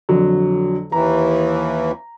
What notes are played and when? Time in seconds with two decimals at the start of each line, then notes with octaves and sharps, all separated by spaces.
0.09 F2 D3 F#3
0.92 D#2 E3 A#5